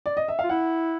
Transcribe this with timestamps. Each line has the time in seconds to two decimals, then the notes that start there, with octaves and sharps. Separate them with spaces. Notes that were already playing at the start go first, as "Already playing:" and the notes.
0.06 D5
0.17 D#5
0.28 E5
0.39 F4 F5
0.49 E4 F#5